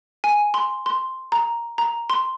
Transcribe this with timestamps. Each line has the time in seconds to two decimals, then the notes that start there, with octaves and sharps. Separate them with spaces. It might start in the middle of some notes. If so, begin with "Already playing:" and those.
0.24 G#5
0.54 C6
0.86 C6
1.32 A#5
1.78 A#5
2.10 C6